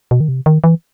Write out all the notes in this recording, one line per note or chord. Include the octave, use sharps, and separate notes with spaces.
B2
D#3
C3
D#3
E3